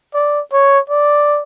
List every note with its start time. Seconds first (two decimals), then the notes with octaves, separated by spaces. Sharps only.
0.14 D5
0.52 C#5
0.89 D5